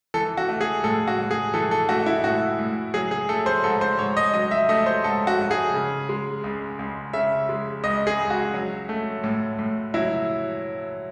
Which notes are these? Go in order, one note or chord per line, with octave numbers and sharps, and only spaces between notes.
E3 A4
F#4
A3
G#4
A2 A4
F#4
A2
G#4
E3 A4
A4
A3 F#4
E4
A2 F#4
A2
F#3 G#4
G#4
A3 A4
C5
G#2 A4
C5
G#2 C#5
D#5
F#3 D#5
E5
A3 D#5
C5
G#2 A4
F#4
G#2
G#4
C#3
G#3
C#2
C#2
C#3 E5
G#3
C#2 D#5
G#4
C#2
F#4
F#3
A3
A2
A2
F#3 E4